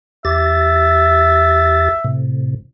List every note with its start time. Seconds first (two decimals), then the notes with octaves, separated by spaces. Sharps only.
0.25 E2 G4 E5 A6
2.04 A2 C3